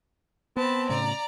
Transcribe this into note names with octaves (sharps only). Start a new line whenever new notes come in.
B3 C4 A5 B5
A2 C#3 D5 A#5